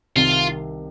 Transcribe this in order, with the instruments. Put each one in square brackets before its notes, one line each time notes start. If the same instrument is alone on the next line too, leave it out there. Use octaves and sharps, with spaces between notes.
[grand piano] C2 C3 D#3 [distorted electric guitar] F4